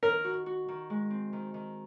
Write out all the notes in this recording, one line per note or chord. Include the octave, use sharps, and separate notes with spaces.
D#3 A#4
F#4
F#4
D#3
G#3
C4
D#3
D#3